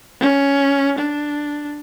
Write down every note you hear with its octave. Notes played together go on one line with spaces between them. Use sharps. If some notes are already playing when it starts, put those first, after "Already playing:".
C#4
D4